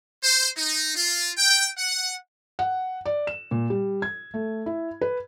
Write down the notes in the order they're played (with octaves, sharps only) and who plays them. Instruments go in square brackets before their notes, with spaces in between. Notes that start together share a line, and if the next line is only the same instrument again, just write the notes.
[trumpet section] C5
D#4
F4
G5
F#5
[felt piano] F#5
D5
E7
A#2
G3
G#6
A3
E4
B4